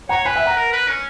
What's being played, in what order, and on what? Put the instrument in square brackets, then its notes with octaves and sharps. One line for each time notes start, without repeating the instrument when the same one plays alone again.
[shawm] C#5 [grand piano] F#5 A#5
[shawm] B4 [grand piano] G#5 B5
[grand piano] E5 G#5
F#5 A#5
[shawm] A#4
B4
C#4